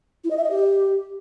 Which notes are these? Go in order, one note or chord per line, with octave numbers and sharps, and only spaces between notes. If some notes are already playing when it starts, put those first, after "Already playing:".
E4
D#5
E5
D#5
G4